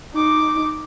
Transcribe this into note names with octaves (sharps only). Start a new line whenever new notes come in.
D#4 D6